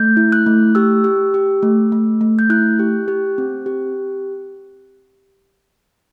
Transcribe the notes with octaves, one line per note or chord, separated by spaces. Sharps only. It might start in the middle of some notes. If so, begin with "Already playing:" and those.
Already playing: A3 G6
E4
F#6
A3
G4 E6
G4
G4
A3
A3
A3
G6
E4 F#6
G4
G4
C4
G4